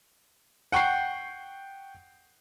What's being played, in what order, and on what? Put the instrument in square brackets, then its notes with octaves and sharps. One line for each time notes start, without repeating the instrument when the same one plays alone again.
[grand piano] F#5 G5 C#6 G6 C7